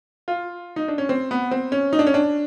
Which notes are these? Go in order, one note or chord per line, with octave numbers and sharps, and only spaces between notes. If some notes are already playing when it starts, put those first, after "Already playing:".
F4
D#4
D4
C#4
C4
B3
C4
C#4
D#4
D4
C#4
D4